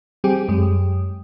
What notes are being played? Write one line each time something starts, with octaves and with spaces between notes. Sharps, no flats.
G3 C4 G4 G#4
F#2 G#3 G4